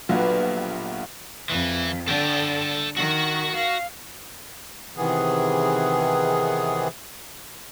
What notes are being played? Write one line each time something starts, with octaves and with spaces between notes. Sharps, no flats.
A#1 B2 D3 F#3 G3 F4
F2 E3
D3 A4 G5
D#3 F#4
F5
C3 D#3 E3 B3 G#4